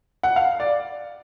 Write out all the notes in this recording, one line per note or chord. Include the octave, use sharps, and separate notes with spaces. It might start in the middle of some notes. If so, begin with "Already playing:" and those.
F#5
F5
D5